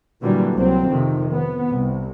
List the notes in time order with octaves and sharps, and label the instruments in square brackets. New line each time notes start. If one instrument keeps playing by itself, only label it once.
[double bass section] A#2 D3 E3 F#3 G3 A#3
C2 F#3 C4
F2 C3 D#3
B3
C2